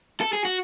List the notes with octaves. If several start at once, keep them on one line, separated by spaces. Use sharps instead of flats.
A4
G#4
F#4